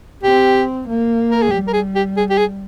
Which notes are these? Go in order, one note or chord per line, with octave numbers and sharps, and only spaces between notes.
C4 G4
A#3
A#4
G#4
G3 G4
A#4
G#4
G4
G#4
G4
G#4